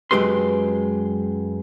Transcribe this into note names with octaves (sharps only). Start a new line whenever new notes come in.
F#2 G#3 G4 B4 C6